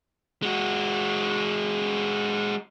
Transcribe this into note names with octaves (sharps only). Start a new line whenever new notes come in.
G#3 F#4